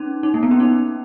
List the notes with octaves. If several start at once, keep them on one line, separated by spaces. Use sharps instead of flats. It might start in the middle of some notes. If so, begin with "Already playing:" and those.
Already playing: C#4 D#4
D#4
A#3
B3
C#4
D#4